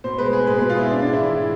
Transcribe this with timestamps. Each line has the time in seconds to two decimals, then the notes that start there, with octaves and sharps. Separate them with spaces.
0.04 B2 C5
0.18 G#3 B4
0.33 G#3 G#4
0.47 B2 B4
0.59 B2 G#4
0.70 F4
0.77 G#3 E4
0.91 G#3 D4
1.02 A2 D4
1.13 E4
1.20 E3 F4
1.35 A2